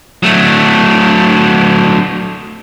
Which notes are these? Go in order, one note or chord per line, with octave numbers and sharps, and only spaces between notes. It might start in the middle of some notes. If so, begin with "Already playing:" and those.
F#3 A3